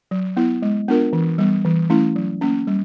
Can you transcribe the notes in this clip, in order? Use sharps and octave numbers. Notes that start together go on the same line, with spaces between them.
F#3
B3 E4
G#3
B3 D4 F4 A#4
E3
G3 B3
E3
A3 C#4 E4
F#3
A#3 C#4
G3